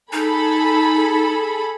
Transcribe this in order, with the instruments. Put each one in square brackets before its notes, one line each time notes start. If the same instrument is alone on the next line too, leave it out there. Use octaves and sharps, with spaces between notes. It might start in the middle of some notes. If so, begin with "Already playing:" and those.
[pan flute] D#4 [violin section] G#4 A4 B5